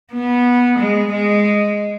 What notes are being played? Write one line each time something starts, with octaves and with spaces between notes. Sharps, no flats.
B3
G#3
G#3